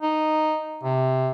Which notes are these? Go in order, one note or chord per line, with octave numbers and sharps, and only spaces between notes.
D#4
C3